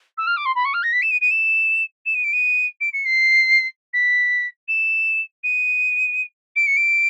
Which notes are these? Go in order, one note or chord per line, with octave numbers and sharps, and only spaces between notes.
E6
F6
D6
C6
B5
C#6
F6
A#6
B6
E7
D#7
D#7
E7
E7
D#7
D7
D#7
D7
C#7
C7
B6
E7
D#7
D7
C#7
D7